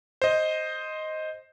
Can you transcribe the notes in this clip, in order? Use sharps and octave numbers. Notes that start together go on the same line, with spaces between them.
C5 D#5